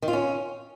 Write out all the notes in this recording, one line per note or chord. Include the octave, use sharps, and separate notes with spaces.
D#3
F4
C#4